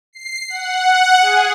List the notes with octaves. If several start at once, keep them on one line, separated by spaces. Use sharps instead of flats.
C7
F#5
G#4